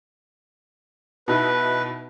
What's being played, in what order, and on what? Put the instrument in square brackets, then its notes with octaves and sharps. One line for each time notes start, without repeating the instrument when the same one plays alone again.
[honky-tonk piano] B2 D#4 E4 [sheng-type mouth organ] B4